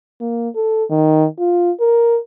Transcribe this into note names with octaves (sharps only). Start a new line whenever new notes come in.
A#3
A4
D#3
F4
A#4